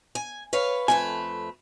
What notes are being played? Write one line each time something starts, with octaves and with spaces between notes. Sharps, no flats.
G#5
B4 C#5 F5
F2 A3 B4 G#5